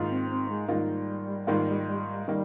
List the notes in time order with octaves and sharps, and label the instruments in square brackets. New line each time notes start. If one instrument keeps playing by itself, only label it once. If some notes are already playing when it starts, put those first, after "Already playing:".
Already playing: [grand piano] G#2 D#3 A#3 F4
[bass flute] C4
C4
G#3
[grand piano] G#2 D#3 A#3 F4 [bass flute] G3
[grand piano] G#2 D#3 A#3 F4
[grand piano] D#3 A#3 [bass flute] G3